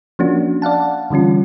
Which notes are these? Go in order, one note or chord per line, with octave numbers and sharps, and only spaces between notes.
F3 A#3 C#4 D4 F#4
D5 F5 F#5 A5
D3 E3 G3 C#4 F4